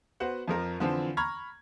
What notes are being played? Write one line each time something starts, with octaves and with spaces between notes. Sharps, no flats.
B3 F#4 C5 F#5
F2 F3 A#4
D3 E3 F3 C4
A#5 B5 C#6 F6 G#6